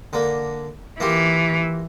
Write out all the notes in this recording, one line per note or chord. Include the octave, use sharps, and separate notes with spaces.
D3 A#3
E3 A#3 F4 G4